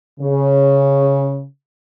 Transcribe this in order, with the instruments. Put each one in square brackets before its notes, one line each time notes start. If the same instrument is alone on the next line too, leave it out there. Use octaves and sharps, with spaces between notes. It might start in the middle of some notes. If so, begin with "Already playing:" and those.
[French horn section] C#3